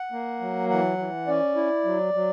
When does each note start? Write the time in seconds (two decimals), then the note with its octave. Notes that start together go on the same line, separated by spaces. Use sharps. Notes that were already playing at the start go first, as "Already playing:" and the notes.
Already playing: F#5
0.12 A#3
0.40 F#3
0.69 E3 F#5
0.98 E3
1.27 C#4 D5
1.56 E4
1.85 F#3
2.14 F#3